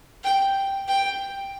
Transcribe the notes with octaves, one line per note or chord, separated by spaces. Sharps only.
G5
G5